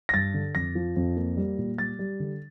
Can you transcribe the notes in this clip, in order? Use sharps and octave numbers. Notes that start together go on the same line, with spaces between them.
A#6
G2 A6
D3
F2 A#6
F3
F2
A#3
G3
A#2
G3 A6
G3
D3